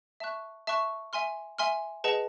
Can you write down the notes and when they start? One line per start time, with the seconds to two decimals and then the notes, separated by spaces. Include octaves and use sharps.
0.20 E5 A5 C#6 F#6
0.67 E5 A5 C#6 F#6
1.13 E5 G#5 C6 F6
1.58 E5 G#5 C6 F6
2.04 G#4 B4 D#5 F#5 A5